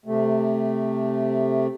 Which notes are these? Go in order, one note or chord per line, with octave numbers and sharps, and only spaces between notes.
C3 A3